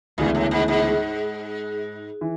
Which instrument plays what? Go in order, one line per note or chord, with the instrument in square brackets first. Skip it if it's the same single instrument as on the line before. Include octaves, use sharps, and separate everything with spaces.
[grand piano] D2 C#3 E3 G#3 B3 [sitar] A#2
[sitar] A2
G#2
G#2
[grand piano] E3